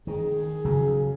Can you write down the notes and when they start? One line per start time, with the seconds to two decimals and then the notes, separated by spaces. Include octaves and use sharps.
0.07 D#3 G#4
0.65 C#3 F#3